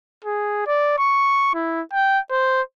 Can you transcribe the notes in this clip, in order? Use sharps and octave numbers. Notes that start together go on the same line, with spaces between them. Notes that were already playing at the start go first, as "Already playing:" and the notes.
G#4
D5
C#6
E4
G5
C5